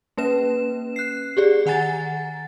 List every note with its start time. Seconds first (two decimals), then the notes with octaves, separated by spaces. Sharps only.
0.17 A#3 C#4 B4 E7
0.96 F#6 C7
1.37 G4 G#4 D5
1.66 D#3 F#5 G#5 A#5 A6